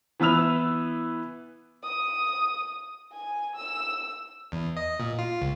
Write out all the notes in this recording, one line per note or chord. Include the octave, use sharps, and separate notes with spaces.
E3 B3 B4 E6 F7
D#6
G#5
E6
E2
D#5
A#2
F4
C#2